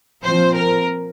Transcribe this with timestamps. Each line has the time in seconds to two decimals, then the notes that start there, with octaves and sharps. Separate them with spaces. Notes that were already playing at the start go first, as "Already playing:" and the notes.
0.24 A#2 F3 C4 C5
0.55 A#4